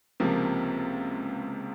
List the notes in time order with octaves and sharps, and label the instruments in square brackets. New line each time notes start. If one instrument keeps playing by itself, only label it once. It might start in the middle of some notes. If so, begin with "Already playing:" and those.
[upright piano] C#2 C3 F3 A#3